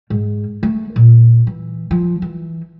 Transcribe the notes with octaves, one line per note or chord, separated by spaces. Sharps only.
G#2
A3
A#2
E3
F3
E3